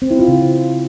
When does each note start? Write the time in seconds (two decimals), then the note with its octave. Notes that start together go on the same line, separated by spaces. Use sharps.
0.02 C4
0.11 E4
0.19 F4
0.28 C#3